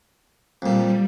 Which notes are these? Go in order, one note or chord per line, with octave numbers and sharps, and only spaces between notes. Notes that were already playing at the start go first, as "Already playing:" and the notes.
F2 A#2 G3